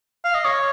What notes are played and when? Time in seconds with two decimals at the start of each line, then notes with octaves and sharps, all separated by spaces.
0.25 F5
0.35 D#5
0.44 C#5